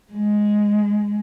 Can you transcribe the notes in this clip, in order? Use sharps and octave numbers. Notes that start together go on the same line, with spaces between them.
G#3